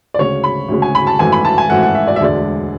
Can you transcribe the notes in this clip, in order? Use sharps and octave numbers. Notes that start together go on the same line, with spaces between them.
D5
D2 C#3 G#3 C#5
B5
D2 C#3 G#3
G#5
B5
A5
G#1 F#2 E3 A3 G#5
B5
A5
G#5
G#1 F#2 E3 A3 F#5
F#5
E5
D5
E5
E1 D2 D3 G#3 D5